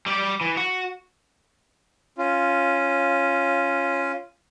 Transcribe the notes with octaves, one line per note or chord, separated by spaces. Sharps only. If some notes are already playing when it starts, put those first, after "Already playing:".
G3 D5
E3
F#4
C#4 F4